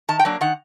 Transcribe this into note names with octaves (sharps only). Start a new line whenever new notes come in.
D#3 A5
G5
F#3 A#3 D4
D#3 F#5